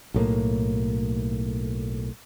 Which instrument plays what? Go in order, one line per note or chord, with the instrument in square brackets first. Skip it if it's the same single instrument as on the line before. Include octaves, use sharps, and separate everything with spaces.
[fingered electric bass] B1 A2 A#3